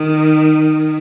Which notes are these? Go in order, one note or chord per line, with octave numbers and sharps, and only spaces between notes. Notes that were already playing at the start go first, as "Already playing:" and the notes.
Already playing: D#3